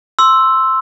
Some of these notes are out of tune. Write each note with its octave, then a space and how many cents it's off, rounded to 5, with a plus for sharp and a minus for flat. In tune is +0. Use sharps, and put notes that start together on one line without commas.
C6 +0 E6 +0